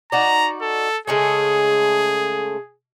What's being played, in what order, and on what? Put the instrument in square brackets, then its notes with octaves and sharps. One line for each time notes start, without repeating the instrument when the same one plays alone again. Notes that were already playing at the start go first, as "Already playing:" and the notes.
[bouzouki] D#4 F#4 D5 [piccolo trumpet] A#5
[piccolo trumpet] A4
[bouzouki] C#3 G#3 A3 [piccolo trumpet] G#4